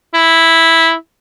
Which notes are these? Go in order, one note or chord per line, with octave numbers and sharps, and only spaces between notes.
E4